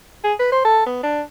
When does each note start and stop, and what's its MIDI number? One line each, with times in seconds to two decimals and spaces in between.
0.24 0.34 68
0.39 0.49 71
0.52 0.62 72
0.65 0.82 69
0.86 0.99 59
1.03 1.21 62